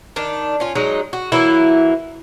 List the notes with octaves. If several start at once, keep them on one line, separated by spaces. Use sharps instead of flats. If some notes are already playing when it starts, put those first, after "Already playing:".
D#3 D4
C#4 F4
F#3 G#3 D#4
F#4
E3 F#3 A#3 E4